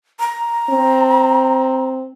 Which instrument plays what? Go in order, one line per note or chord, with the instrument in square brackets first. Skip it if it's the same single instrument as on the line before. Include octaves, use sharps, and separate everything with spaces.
[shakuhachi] A#5
[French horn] C4